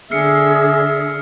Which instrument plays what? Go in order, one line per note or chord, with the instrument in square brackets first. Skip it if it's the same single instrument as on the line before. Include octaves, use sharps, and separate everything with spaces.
[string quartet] D3 [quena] G#4 [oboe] E5 [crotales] F6 C7 C#7